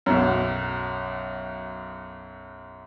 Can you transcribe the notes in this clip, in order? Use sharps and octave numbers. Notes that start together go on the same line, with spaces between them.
B1 F#2